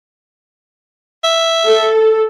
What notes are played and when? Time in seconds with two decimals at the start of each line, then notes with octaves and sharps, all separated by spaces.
1.24 E5
1.65 A4